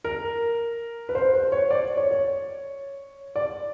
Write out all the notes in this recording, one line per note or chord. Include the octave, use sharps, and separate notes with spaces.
A#4
B4
C5
C5
C#5
D5
C#5
C#5
D5